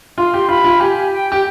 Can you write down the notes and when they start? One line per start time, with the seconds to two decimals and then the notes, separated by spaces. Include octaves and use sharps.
0.18 F4 C6
0.34 G4
0.48 F4 B5
0.64 F4
0.80 G4 G#5
1.12 G5
1.32 G4